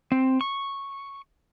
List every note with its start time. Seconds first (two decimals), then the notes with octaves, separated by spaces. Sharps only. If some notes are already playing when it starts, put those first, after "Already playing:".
0.12 C4
0.41 C#6